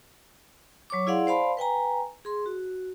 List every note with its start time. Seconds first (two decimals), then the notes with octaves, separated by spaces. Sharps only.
0.90 F#3 C#5 C#6 D6
1.07 E4 G#4 D5 F5 F#5 C6
1.27 C5 D5 F5 A5 B5 C6
1.57 B4 G5 G#5 A#5
2.25 G#4 C6
2.46 F#4